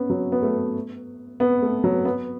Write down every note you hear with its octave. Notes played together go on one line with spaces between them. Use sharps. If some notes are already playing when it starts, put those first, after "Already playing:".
Already playing: B3 C#4
F#3
B3
A3
B3
A3
F#3
B3